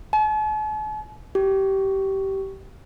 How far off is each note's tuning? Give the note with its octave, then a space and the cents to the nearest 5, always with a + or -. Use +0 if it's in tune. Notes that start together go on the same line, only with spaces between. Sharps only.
A5 -45
G4 -20